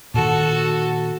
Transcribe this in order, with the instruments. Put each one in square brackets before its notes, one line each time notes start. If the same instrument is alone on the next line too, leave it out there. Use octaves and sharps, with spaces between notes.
[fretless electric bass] A#2 D#3 [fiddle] F#4 A4